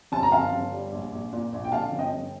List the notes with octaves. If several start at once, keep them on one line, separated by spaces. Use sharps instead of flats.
G1 A5
A#5
G1 F5 A5
G1
G3
A#1
A#1
A#2
A#1
G5
D3 F5 A5
G1
D#5 G5
G1